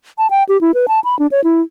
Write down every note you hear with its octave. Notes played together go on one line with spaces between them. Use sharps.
A5
G5
G4
E4
B4
A5
B5
D4
C#5
E4